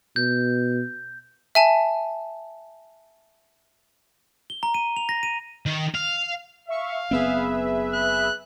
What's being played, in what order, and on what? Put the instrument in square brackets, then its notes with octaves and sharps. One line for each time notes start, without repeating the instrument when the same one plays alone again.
[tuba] B2 [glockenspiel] G6
[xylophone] E5 G#5 A5
[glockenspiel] G7
A#5
D#7
F7
A#6
D#7
[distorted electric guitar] D#3
F5
[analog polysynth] E5 C#6 [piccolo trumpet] F5
[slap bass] F#1 B3 C4 [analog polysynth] G#4 B4 E5
[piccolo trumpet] F#6